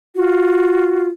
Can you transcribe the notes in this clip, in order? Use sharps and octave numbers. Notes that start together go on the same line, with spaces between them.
F4 F#4